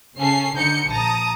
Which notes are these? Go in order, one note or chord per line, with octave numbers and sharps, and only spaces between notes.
C#3 C#4 A4 C7
D3 D#4 G6 C#7
A#1 A5 A#5 D#6